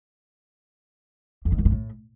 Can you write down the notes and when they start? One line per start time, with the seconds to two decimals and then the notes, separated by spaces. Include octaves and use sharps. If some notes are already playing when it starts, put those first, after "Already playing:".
1.45 F2
1.52 G#2
1.59 F#2
1.65 G#2
1.72 A2